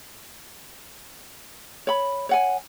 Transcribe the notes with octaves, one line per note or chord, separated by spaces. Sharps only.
C#5 B5
C#5 F#5 G#5